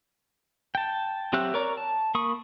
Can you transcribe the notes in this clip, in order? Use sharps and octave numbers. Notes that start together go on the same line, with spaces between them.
G5 A5
F#3 C4 G4 E5 F#6
A#4 C#5 D5 A#5
A5
A#3 B5 C#6 D#6